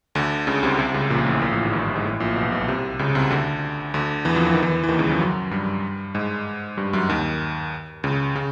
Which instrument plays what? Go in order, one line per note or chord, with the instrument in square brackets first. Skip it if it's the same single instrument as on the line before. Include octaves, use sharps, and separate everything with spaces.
[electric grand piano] D2 D3
C#2 C#3
C2 C3
C2 C3
C#2 C#3
A#1 A#2
A1 A2
A#1 A#2
A1 A2
G#1 G#2
G1 G2
G#2
A1 A2
A#1 A#2
B1 B2
B1 B2
C2 C3
C#2 C#3
C2 C3
D2 D3
D2 D3
E2 E3
F2 F3
E3
D#3
E2 E3
E3
D#2 D#3
C#2 C#3
F2 F3
F#2 F#3
G2 G3
G#2 G#3
G2 G3
F#2 F#3
D#2 D#3
C#2 C#3
C#3